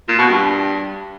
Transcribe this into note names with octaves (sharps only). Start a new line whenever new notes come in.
A#2
B2
G2